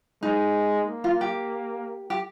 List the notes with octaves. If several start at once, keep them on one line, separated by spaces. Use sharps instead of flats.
G#3 D#4
A#3
F4
G4
G4